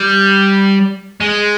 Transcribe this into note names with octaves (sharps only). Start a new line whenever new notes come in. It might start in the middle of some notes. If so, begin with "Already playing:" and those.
Already playing: G3
G#3